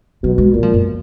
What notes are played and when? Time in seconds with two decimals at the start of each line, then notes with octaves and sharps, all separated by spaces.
0.23 B2 F#3
0.38 G#3
0.53 A#2 F#3
0.63 F3
0.74 F#2